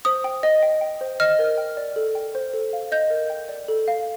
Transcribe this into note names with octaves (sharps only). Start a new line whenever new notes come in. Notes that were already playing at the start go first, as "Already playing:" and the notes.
C5 D#6
G5
D#5
G5
G5
C5
D#5 F6
A#4
G5
D5
A4
G5
C5
A4
F5
D#5 G6
A#4
G5
D5
A4
F5